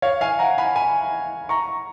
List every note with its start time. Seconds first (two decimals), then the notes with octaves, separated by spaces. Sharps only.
0.02 C#5 F5
0.21 F5 G#5
0.39 F#5 A#5
0.58 G#5 B5
0.76 G#5 B5
1.49 A#5 C#6